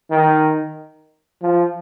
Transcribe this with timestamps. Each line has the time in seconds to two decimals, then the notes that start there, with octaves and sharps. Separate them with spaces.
0.10 D#3
1.42 F3